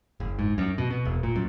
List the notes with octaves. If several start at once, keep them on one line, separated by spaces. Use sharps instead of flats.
F#1
G#2
F#2
B2
B2
E1
A#2
F#2